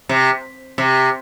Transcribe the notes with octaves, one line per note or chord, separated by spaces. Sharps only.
C3
C3